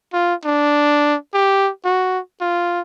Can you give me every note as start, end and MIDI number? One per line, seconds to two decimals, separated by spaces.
0.13 0.35 65
0.45 1.16 62
1.34 1.70 67
1.85 2.19 66
2.41 2.81 65